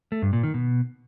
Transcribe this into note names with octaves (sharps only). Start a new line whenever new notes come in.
A3
G2
A#2
D#3
B2